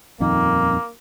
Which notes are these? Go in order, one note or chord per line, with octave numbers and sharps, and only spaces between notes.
D#1 F2 D#3 A#3